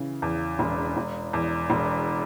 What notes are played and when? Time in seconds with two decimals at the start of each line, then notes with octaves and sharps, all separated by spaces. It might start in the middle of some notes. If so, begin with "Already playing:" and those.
Already playing: C#3 E3
0.22 E2
0.59 E1
0.97 E1
1.33 E2
1.70 E1